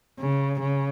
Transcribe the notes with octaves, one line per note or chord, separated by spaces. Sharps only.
C#3
C#3